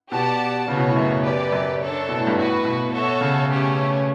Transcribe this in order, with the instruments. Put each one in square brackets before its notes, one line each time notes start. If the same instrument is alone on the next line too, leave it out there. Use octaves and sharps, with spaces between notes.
[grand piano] B2 [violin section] G4 D5 F#5 A5
[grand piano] C#3 [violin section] B3 F#4 C#5
[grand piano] B2
A2
F#2
[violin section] G4 B4 D5
[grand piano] F#2
[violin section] D4 A4 C#5
[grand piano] B2
A2
G2
[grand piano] A2 [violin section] B3 F#4 B4
[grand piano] B2
[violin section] F#4 A4 C#5 E5
[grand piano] C#3
[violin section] A3 C#4 G4 C#5